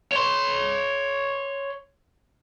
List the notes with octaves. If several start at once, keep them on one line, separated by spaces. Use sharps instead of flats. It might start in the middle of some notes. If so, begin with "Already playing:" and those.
C#5 C6